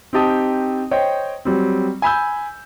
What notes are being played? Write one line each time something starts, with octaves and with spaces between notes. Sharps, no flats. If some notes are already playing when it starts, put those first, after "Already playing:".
C4 D#4 G4 A5 D#6
C5 C#5 D#5 G5
F#3 G3 C4
G#5 B5 E6 G6